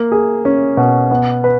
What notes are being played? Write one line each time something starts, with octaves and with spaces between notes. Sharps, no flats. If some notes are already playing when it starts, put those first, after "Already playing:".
Already playing: A#3
G#4
C#4
B2
B3
B4